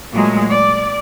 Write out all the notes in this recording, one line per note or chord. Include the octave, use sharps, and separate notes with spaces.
A#2 F#3 G#3 A3
D5